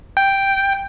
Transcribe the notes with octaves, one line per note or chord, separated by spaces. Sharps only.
G5